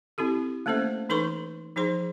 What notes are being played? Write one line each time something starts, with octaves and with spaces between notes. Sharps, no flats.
C4 E4 G4 A4
A3 A#3 C#4 A4 C5 E5
E3 D#4 A4 B4 C6 C#6
F3 D#4 G#4 C5 C6